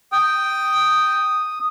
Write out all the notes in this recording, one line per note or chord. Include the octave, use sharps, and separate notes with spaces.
G5 D#6